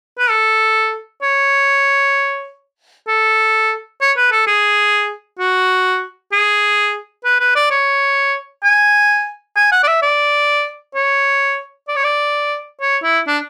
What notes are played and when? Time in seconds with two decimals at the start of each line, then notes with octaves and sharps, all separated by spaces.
0.19 B4
0.30 A4
1.23 C#5
3.08 A4
4.01 C#5
4.17 B4
4.32 A4
4.47 G#4
5.39 F#4
6.32 G#4
7.25 B4
7.40 B4
7.56 D5
7.71 C#5
8.64 G#5
9.57 G#5
9.72 F#5
9.83 D5
9.88 E5
10.02 D5
10.95 C#5
11.88 D5
11.96 C#5
12.04 D5
12.81 C#5
13.03 E4
13.27 D4